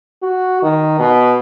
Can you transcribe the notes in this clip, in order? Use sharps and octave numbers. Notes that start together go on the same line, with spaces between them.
F#4
D#3
B2